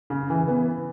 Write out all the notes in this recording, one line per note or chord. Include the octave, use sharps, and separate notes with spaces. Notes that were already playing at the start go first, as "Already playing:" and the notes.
C#3
E3
B3